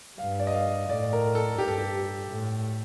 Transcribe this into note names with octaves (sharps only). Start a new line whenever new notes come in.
G2 F5
D5
D#5
F5
A2 D5
A#4
A4
G2 G4
A4
G4
A2